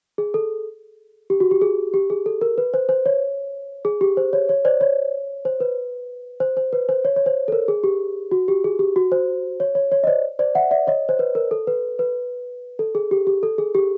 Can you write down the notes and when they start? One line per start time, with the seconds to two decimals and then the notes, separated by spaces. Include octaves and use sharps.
0.18 G#4
0.34 A4
1.30 G4
1.40 F#4
1.51 G4
1.62 G#4
1.94 G4
2.10 G#4
2.26 A4
2.41 A#4
2.58 B4
2.74 C5
2.89 C5
3.06 C#5
3.85 G#4
4.01 G4
4.17 C5
4.33 C#5
4.49 C#5
4.65 C5 D5
4.81 C#5
5.45 C5
5.60 B4
6.40 C5
6.57 C5
6.73 B4
6.89 C5
7.05 C#5
7.16 C#5
7.26 C5
7.48 A4
7.52 A#4
7.68 G#4
7.84 G4
8.31 F#4
8.48 G4
8.64 G#4
8.79 G4
8.96 F#4
9.12 C5
9.60 C#5
9.75 C#5
9.92 C#5
10.04 D#5
10.07 C5 D5
10.39 C5 D5
10.55 E5 F#5
10.71 D5 E5
10.87 C#5 D#5
11.09 C5
11.19 B4
11.35 A#4
11.51 A4
11.67 B4
11.99 B4
12.79 A4
12.95 G#4
13.11 G4
13.27 G4
13.43 A4
13.58 G#4
13.75 G4